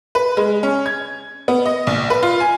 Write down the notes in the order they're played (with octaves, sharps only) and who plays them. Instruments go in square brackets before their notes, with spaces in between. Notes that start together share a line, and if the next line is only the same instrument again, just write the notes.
[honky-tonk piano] B4
G#3
C#4
G#6
B3
D#5
A#1
B4
F4
G#5